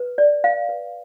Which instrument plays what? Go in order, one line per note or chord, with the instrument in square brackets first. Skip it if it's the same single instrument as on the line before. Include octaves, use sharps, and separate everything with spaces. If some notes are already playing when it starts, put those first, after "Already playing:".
Already playing: [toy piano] B4
D5
F5
B4